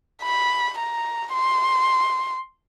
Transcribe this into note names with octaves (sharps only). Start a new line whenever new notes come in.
B5
A#5
C6